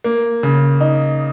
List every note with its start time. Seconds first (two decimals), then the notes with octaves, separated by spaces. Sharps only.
0.04 A#3
0.43 C#3
0.81 D#4